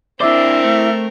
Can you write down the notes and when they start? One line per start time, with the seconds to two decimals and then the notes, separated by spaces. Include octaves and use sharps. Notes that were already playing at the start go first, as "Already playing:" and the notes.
0.21 C4 D4 E4 A#4 C5 D5 E5
0.64 A3